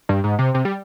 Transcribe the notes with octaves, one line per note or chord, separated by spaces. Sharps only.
G2
G#2
C3
C3
G3